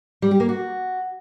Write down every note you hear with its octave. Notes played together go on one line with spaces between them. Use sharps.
G3
G4
A#3
F#4